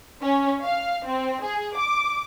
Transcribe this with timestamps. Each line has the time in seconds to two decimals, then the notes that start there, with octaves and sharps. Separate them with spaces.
0.23 C#4
0.63 F5
1.05 C4
1.44 G#4
1.75 D6